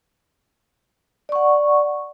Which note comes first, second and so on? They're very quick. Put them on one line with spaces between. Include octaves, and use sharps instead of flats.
D5 C#6 F#5